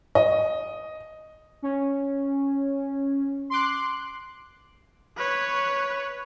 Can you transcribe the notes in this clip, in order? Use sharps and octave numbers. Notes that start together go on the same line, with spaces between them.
D#5
C#4
C6 D6 F#6
B4 C#5